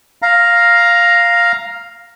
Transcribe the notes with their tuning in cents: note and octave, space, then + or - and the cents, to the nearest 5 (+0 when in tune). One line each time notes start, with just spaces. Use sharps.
F5 +0 A#5 +5